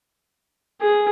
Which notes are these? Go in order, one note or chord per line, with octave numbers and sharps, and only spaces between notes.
G#4